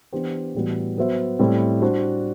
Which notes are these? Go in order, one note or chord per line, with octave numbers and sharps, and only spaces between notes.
E3 B3 D4 G4 C5
A2 E3 G3 B3 F#4
F#3 B3 F#4 C5 E5
A2 G3 C4 E4 A4
G3 D4 F#4 C5